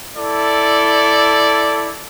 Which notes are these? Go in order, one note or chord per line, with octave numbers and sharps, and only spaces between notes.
E4 A4 D5